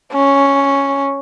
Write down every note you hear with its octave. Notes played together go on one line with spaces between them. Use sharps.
C#4